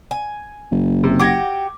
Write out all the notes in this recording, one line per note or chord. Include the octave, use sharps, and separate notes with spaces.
G#5
F#1
C3
F#4 G4 D6 G#6 A#6